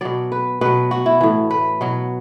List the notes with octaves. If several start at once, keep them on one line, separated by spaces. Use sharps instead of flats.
B2 F#3 D5
B4
B2 F#3 B4
F#4
E4
A2 E3
B4
B2 F#3